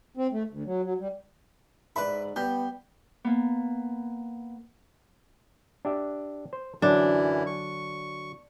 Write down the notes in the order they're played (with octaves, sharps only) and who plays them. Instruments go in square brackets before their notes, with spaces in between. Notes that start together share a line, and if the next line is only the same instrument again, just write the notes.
[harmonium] C4
A3
D2
F#3
F#3
G3
[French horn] G#2 [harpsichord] B4 E5 [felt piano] D5 B5
[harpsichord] G3 [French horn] B3 [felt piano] G6
[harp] A#3 B3
[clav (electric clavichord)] D4 G4 E5
C5
[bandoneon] F#2 E3 E4 [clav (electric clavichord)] D3 F#3 [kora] D4
[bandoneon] C#6